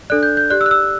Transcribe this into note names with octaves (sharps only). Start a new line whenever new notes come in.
D4 A4 D5 F#6
G6
G6
G4 D5 F#6
E6
F#6
E6